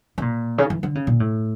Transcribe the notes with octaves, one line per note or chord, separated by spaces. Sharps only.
C#3
A#2
C#3
E3
D3
C#3
A#2
A2